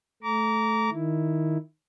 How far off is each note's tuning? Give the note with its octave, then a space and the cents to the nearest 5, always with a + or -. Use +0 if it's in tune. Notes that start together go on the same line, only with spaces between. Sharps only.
A3 -10 A#5 +0 D6 -30
D#3 +0 E4 +0